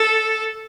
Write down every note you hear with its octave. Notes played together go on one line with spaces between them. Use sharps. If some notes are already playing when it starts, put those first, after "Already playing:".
Already playing: A4